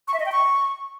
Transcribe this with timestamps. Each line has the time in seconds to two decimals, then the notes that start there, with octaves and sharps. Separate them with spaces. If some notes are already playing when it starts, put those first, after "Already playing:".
0.08 C#6
0.14 E5
0.20 D#5
0.26 G5
0.32 C#6